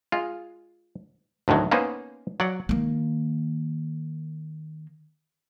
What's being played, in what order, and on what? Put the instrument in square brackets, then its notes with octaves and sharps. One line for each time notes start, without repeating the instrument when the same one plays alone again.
[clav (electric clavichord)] G#3 F4
D2 A2 D3 D#3 F#3
A#3 B3 C#4 D#4 B4 C5
F#3 D5 F#5
[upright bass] D#3 A#3